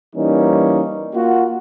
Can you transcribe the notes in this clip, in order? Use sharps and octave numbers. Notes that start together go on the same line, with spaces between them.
E3 G3 A#3 C#4 D#4
A#3 F4 F#4